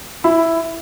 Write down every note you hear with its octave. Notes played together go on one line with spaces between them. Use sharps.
E4